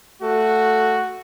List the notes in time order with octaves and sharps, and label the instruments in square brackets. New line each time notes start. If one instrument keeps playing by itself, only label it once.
[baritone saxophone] A3 [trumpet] F#4